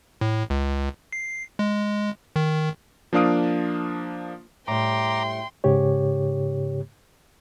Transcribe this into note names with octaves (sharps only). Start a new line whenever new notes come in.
A2
C#2
C7
G#3
D#3
F3 A#3 D4 F5 D#6 D7
A2 G3 G5 A#5 C6 D6
G#2 C#3 G4 C#5